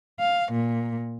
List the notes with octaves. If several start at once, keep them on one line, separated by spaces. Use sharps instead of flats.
F5
A#2